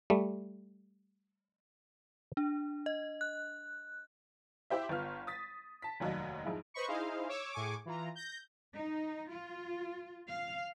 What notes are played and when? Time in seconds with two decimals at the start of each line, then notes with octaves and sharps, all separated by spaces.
0.10 G3 A3
2.37 D4
2.86 D#5
3.21 F#6
4.70 E4 G4 C5 E5
4.89 G1 B3 F4 F6
5.27 D#6 A6 B6
5.82 A5 B6
6.00 F1 D#2 F#3 F#4 D#5
6.45 F2 G#2 G#3 E4
6.74 B4 C5 D#5 B5 C#6
6.88 D#4 E4 G#4 C5 D#5 F5
7.28 C#5 D6 E6
7.53 A2 G#4 G#5 C#6 D6
7.85 E3 F4 A#5
8.15 G6 A#6
8.74 D#4
9.29 F4
10.29 F5